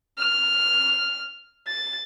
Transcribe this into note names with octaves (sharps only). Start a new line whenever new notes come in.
F6
A6